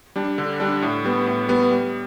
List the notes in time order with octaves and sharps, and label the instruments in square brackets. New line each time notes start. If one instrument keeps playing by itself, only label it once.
[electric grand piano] G3 D4
D3
G3 D4
A2
G3 B3
A2
G3 B3
G3